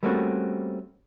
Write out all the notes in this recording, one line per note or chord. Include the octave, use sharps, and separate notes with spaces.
G3 A3 A#3 C4 C#4 F#4